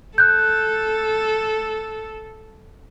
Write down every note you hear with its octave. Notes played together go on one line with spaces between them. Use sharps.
A4 F#6 G6